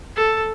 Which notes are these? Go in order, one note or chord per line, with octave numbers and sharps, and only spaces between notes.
A4